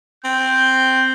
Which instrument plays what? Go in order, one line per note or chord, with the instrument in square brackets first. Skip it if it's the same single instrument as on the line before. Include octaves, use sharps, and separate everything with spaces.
[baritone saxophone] C4 [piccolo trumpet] G6